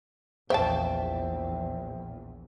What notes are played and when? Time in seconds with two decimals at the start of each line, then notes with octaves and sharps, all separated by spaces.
0.50 A#1 E2 C#3 C5 E5 G5 A5